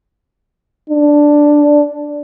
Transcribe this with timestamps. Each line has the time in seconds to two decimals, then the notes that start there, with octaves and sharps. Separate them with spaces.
0.90 D4